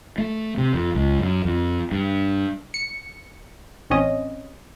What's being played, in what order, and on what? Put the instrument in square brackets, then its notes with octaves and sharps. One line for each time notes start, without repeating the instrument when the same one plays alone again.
[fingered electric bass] A3
C3
F2
C#2
F#2
F2
G2
[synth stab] C#7
A1 C4 C#4 D#5